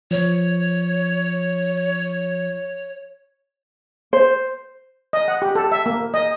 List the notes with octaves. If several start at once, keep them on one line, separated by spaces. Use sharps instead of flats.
F3 C#5
C5
D#5
F#5
G4
A4
E5
A#3
D#5